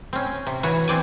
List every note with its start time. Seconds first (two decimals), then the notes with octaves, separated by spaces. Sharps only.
0.13 C4 C#4
0.47 C3
0.63 E3 F#4 C#5
0.88 C4 D5 G#5